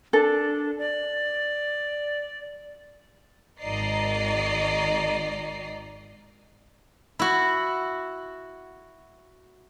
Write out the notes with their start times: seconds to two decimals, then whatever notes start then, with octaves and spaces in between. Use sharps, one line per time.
0.13 D4 A4
0.79 D5
3.61 G#1 D#3 D5 D#5 A#5 C7
7.19 E4 F#4